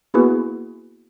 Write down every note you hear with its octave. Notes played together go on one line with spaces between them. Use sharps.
A#3 B3 E4 F#4 G#4 B4